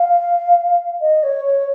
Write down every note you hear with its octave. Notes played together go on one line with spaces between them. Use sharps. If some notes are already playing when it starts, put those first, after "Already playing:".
Already playing: F5
D#5
C#5
C#5